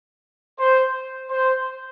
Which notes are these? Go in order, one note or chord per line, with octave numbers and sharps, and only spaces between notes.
C5
C5